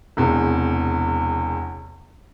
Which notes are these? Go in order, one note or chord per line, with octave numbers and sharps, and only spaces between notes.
E1 E2 C3